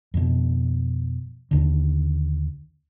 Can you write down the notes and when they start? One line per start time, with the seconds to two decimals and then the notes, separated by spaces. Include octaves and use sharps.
0.14 F2 B2
1.51 D#2 D3